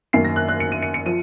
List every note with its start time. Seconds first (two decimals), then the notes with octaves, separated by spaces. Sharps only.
0.13 F#2 D#3 A#3 C7
0.25 A#6
0.36 F#6
0.48 F#6
0.60 C#7
0.72 D#7
0.82 C#7
0.94 C#7
1.06 F3 D#7